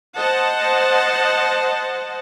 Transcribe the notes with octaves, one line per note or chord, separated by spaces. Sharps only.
C5 D#5 F#5 A5